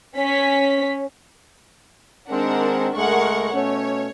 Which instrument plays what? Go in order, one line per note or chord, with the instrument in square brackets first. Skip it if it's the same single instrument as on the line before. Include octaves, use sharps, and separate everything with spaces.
[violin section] C#4 B6 [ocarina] C#5
[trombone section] D#3 G#3 C4 [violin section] D4 A#4 F#5
[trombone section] C#2 G#3 A3 [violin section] A#4 F#5 C#6
[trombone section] B2 A3 C#4 [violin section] C#5